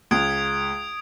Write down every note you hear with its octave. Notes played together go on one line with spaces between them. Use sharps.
C#2 D#6 G#6 D7